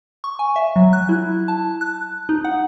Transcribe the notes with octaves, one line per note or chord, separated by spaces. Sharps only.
C#6
G#5
E5
F#3
F#6
E4
A5
F#6
D#4
F#5